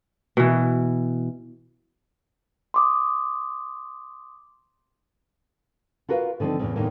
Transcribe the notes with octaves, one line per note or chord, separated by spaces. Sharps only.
B2 E3
C6 D6 D#6
F4 F#4 A#4 B4 E5 F5
D3 D#3 F3 C4 C5
E2 A2 C#3
E2 A2 D3 D#3 A#3